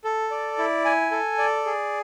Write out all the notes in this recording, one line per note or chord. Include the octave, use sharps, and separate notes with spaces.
A4
D5
E4
G#5
A4
D5
G#4